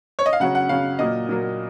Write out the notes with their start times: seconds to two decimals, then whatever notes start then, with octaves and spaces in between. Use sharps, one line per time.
0.19 C#5
0.26 D#5
0.33 F5
0.40 C#3 F#3 C#4 F#5
0.55 F#5
0.69 C#3 F#3 C#4 F5
0.99 A#2 F#3 A#3 D#5
1.29 A#2 F#3 A#3